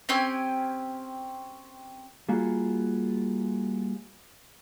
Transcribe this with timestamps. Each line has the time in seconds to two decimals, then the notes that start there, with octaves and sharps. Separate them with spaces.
0.09 C4 C#4 G4 G#5
2.29 G3 A#3 F4 F#4 G#4